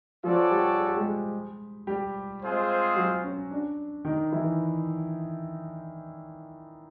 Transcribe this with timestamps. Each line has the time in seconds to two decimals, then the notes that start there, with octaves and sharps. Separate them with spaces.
0.23 F3 C#4 F4 F#4 A4 D5
0.51 G3 G4
0.78 G#4
0.88 G4
0.96 G#3 G#4
1.87 G3 G4
2.41 G#3 C4 F4 G#4 C5
2.96 F#3 F#4
3.24 C#4
3.51 D4
4.05 D#3 D#4
4.32 E3 E4